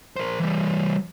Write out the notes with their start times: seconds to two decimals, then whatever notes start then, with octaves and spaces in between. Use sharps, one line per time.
0.16 A#4 C5
0.40 E3 G3